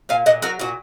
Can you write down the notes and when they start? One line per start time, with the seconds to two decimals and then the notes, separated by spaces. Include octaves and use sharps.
0.09 A#2 F5 G#5
0.26 A#2 D#5 F#5
0.42 F#3 F#4 A#4
0.59 A#2 F#4